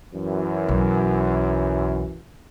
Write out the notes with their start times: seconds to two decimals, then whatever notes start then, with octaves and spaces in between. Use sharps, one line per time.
0.14 F#2 E3
0.68 B1